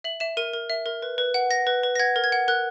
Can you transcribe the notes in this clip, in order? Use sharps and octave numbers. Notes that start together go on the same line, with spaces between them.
E5 F#7
E5 E7
A#4 D#7
A#4
E5
A#4
B4
B4
F#5
F#5 A#6
B4
B4
A#6
F#5 G#6
A#4
G#6
F#5
A#4 F#6